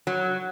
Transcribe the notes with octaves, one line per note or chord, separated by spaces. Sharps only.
F#3